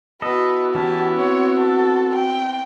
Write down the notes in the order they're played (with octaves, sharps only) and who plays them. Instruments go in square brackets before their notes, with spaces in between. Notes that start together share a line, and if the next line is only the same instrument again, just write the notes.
[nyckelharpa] B3 E4 [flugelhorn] F#4 [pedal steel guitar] A4 D#5 [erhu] B4
[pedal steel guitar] E3 C#4 G4 [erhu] A5
[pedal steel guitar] C4 [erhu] C#5
[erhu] A4
G5